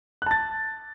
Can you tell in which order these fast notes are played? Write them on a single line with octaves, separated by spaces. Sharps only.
F#6 A5 A6